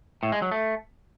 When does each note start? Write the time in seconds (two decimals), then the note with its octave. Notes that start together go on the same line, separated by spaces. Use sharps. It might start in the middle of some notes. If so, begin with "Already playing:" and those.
0.23 A2
0.32 G#3
0.42 F#3
0.51 A3